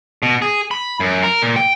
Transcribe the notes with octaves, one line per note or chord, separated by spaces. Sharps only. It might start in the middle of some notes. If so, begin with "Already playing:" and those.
B2
G#4
B5
F#2
A#4
A#2
G5